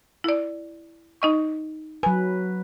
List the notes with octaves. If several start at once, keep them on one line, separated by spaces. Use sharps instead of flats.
E4 D5
D#4 D#5 C#6
F#3 B4 G#5